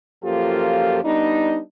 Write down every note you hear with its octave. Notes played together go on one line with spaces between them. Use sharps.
F#2 F3 A#3 F4 G4 A4
G3 B3 D4 D#4